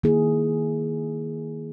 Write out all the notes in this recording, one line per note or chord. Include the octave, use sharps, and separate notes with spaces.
D#3 A#3 E4 G#4